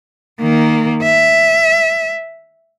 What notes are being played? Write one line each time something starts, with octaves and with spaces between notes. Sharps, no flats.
D#3 A#3
E5